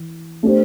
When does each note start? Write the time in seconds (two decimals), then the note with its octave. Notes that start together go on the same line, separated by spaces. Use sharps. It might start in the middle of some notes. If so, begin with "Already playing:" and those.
Already playing: E3
0.43 A3 D4 G4 C5